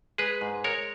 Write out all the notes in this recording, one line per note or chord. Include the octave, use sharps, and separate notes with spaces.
G#3 G#4 B4
G#2
G#3 A#4 C#5